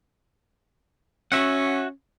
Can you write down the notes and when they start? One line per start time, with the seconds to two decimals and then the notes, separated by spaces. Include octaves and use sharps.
1.32 C#4 F#4 E5 F#5